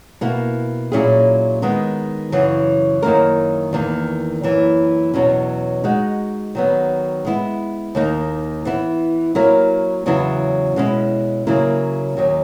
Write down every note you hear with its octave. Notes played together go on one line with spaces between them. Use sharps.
B2 A#3 E4
A#2 F#3 C#4 E4 G#4
D#3 G#3 B3
F#2 C#3 E3
F#2 D#3 A#3 E4 A#4
E2 D#3 A#3
F#2 E3 A#3
E2 B2 F#3 C#4
G#3 D#4 F#4
D#3 F#3 B3
G#3 B3 E4
D#2 D#3 A#3 D#4
E3 B3 E4
F#3 A#3 E4 A#4
E2 C#3 F#3 B3 E4
B2 G#3 C#4 E4
C#3 F#3 A#3 E4 A#4
D#2 D#3 F#3